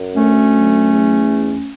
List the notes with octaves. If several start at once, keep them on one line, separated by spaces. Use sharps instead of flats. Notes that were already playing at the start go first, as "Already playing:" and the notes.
Already playing: F#2
D2 A3 C#4
F#3
E2